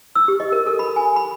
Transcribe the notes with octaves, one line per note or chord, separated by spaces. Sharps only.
E6
G4
D#5
A#4
A4
B5
G#5
B5